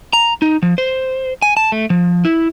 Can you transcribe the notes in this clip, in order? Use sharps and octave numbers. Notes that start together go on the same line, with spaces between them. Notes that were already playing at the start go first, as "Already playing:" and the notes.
A#5
D#4
F3
C5
G#5
A5
A3
F3
E4